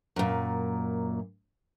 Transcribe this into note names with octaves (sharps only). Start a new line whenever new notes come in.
F#2 A#2